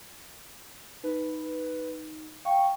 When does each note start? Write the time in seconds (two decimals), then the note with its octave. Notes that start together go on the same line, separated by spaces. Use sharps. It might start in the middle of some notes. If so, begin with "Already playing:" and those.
1.04 D#4 B4
2.45 F5 G5 C#6